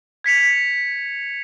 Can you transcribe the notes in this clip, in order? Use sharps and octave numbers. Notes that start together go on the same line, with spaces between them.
G#6 B6 C#7 F7